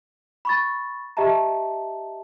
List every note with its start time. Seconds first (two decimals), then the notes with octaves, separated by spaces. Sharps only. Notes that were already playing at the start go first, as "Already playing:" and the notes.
0.45 B5 C#6 A6
1.17 G4 D#5 E5 A5 A#5